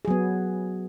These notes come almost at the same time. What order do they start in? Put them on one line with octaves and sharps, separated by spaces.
G#4 F#3 B3